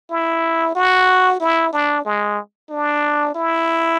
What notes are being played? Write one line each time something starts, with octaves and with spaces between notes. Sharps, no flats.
E4
F#4
E4
D4
G#3
D4
E4